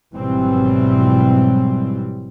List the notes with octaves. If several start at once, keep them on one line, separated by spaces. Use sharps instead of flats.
G#1 B2 E3 F#3 G3 C4